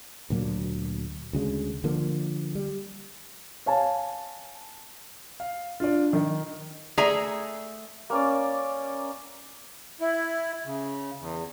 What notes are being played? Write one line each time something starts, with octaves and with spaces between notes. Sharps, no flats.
D2 A#2 F#3 A#3
D2 C#3 G#3
D3 F3 A#3
G3
C#5 F5 G#5 A5
F5
D4 F4 D5
D#3
A3 G#4 D5 E5 A#5
A#3 C#4 D5
E4
C#3
E2